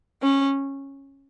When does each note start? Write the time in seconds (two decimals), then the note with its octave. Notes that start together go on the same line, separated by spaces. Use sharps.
0.21 C#4